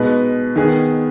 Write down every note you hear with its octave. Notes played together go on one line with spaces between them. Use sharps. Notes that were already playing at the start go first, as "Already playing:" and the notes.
Already playing: B2 G#3 D#4 B4
D#3 B3 G#4